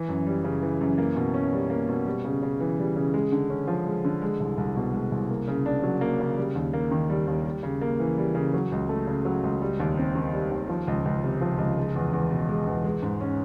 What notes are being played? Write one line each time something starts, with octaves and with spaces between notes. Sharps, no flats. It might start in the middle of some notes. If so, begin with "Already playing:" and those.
Already playing: E3
F#2
G3
C#3
E3
F#2
A#3
B2
C#4
G3
A#3
B2
G3
C#3
C#3
E3
G3
C#3
G#3
D3
C#4
F3
G#3
D3
G#3
C2
C2
B2
G#3
C2
A#3
C#3
D4
F#3
A#3
C#3
G3
D#2
A#3
D#3
G3
D#2
G3
C#3
A#3
E3
G3
C#3
F#3
C#2
A3
C#3
F#3
C#2
G3
D#2
C4
D#3
G3
D#2
F3
C#2
C#2
C3
F3
C#2
G#3
E2
E2
B2
G#3
E2
G#3
G#2
C#4